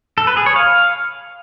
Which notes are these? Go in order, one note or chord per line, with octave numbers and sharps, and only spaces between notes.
A4
B4
G#4
C#5
F5